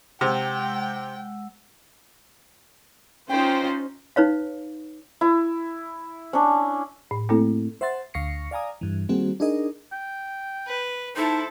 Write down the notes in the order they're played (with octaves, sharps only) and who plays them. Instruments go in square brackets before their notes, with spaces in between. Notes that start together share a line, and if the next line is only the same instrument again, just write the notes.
[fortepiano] C3 [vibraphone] G#3 F#5 E6 [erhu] G5
[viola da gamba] C#4 [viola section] D#4 F4 C5 [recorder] G5
[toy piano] D#4 B4 C#5 F5
[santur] E4
C#4 D4
[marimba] A2
A3 A#3 C4 E4 A4
[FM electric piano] C5 E5 F#5 C6 A6
D2 F5 C#6 A#6 C7 C#7
D5 F5 G#5 A#5 D#6
G2 E3
D#3 G3 A#3 C4 F#4 G#4
D4 D#4 G#4 A#4 D#5
[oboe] G5
[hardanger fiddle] B4
[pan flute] D#4 [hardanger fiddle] E4 [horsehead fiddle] A4 A5 [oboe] C5